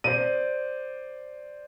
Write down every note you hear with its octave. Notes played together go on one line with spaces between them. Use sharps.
C5 D5 D#7